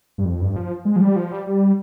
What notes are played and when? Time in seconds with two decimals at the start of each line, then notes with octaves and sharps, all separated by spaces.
0.18 G2
0.25 F2
0.41 G2
0.56 F3
0.85 G#3
0.96 F3
1.01 G3
1.16 F3
1.32 G3
1.47 G3